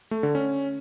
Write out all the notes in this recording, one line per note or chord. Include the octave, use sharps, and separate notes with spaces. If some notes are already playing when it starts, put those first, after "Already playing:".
A3
D3
C#4